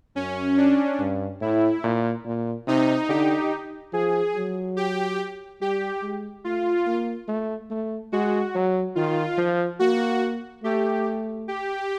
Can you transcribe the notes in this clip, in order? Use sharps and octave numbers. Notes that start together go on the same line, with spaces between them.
F#2 C#4
D4
G2
A2 E4
A#2
A#2
C3 D#4
D3 G4
F3 G#4
F#3
G4
G3 G4
G#3
A3 F4
A#3
A3
A3
G#3 F#4
F#3
D#3 F4
F3
A#3 F#4
A3 G4
G4